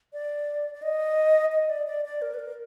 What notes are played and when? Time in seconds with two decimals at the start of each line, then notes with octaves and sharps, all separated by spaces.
0.13 D5
0.74 D5
0.82 D#5
1.52 D#5
1.69 D5
1.87 D5
2.05 D5
2.22 A#4
2.34 B4
2.39 A#4